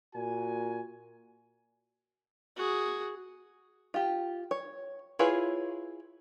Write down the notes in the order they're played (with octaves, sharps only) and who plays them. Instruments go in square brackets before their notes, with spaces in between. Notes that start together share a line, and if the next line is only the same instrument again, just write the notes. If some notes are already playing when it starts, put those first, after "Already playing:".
[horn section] A#2 F#4 G#5
[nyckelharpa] F#4 G#4
[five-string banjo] F4 G4
C#5
E4 F4 G#4 B4 C#5